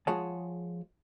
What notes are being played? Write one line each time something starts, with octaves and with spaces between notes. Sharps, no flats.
F3 G#3 G#4 C#5 F#5 A5